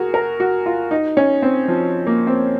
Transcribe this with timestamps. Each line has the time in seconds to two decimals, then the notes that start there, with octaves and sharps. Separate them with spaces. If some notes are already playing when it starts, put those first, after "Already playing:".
Already playing: F#4 G#4 A#4
0.14 A#4
0.40 F#4
0.66 F4
0.91 D#4
1.17 C#4
1.42 C4
1.68 F3
2.07 A#3
2.27 C4